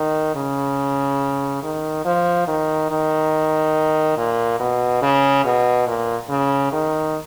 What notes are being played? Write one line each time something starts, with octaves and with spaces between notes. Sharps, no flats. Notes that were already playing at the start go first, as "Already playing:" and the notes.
Already playing: D#3
C#3
D#3
F3
D#3
D#3
A#2
B2
C#3
B2
A#2
C#3
D#3